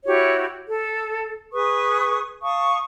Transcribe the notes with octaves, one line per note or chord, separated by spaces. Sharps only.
E4 F#4 G4 C#5
A4
G#4 B4 C#6 D#6
F5 A5 C#6 D#6